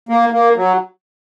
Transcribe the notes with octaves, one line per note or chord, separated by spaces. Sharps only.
A#3
A#3
F#3